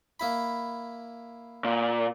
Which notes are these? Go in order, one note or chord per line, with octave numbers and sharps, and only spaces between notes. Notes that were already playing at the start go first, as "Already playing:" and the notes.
A#3 E4 B5
A#2